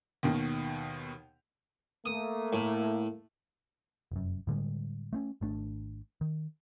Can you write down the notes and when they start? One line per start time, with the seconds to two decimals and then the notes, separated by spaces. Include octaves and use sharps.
0.23 D#2 B2 D#3
2.06 A3 A#3 D#6
2.53 A2
4.12 F1 F#2
4.47 A2 D3 G3 G#3
5.13 A3 C4 C#4
5.41 G#1 A3 D4
6.21 D#3